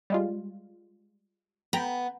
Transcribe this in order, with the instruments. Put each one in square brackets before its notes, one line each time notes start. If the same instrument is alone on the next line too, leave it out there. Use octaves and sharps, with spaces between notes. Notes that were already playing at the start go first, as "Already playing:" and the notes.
[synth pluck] G3 G#3 F4
[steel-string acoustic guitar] B3 [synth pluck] G5 A#5 B5